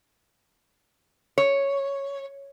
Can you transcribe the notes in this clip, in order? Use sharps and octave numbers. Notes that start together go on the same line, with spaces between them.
C#5